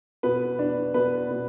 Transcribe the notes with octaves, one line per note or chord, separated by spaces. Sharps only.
B2 B4
D4
B2 B4
B2